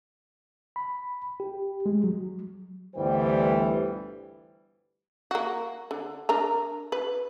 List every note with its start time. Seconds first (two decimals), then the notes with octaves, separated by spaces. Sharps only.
0.76 B5
1.40 G4
1.86 G#3
2.04 F#3
2.96 G1 D2 E3 G3 C5 G5
5.31 A#3 F#4
5.91 D3
6.29 D4 A#4 A#5
6.92 B4